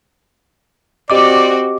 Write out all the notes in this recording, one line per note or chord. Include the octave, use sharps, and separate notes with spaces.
C4 F#4 G4 D5 D#5 D6